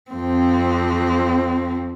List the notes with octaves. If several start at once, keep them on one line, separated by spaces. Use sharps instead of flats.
F2 C4